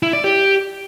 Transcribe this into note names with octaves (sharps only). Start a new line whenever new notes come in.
E4
D5
G4